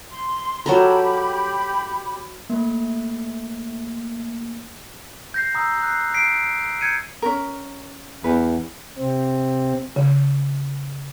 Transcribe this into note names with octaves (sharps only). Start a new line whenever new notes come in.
C6
F#3 G4 A4 A#4 B5
A3 A#3
G6 A#6 C7
A#5 D#6 E6 G6
F#6 C7
B6 C7 D7
G6 G#6 C#7 D#7
C#4 A#4
E2 B4
C3 C4
C#3